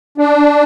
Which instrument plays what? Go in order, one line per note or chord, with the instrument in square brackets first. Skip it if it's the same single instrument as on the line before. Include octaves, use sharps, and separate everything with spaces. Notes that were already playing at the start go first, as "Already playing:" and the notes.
[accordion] D4